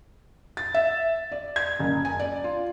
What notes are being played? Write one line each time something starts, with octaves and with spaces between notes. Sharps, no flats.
A6
E5
D5
G#6
F#1
G#5
D5
F4